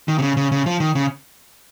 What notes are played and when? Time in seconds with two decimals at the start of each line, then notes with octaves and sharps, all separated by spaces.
0.08 D#3
0.18 C3
0.22 C#3
0.37 C#3
0.52 C#3
0.66 F3
0.80 D#3
0.95 C#3